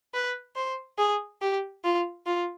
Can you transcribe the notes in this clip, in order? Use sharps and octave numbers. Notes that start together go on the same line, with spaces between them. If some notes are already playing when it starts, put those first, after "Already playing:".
B4
C5
G#4
G4
F4
F4